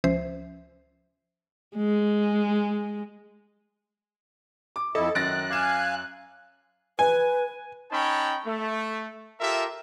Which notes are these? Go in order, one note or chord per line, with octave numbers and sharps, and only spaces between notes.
C#2 F3 C#4 C5 E5 C7
G#3
D6
F2 E4 A4 D#5
F#2 D#3 F#6 A6 A#6 D7
F5 G#5 D6 E7
B4 G#5
C#4 D#4 C#5 G5 A5 B5
A3
F4 G4 A4 A#4 E5